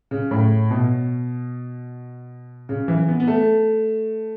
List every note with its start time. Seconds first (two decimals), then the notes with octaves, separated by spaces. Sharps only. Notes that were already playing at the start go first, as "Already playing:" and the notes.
0.11 C#3
0.31 A2
0.71 B2
2.69 C#3
2.88 E3
3.08 B3
3.20 B3
3.28 A3